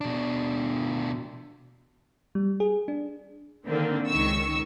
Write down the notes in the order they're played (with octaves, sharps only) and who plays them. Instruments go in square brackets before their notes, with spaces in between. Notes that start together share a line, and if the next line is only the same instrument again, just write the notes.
[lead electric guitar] B2 D4
[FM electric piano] G3
G#4
D4
[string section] D3 D#3 A#3 C4
C#2 D#3 C#6 E6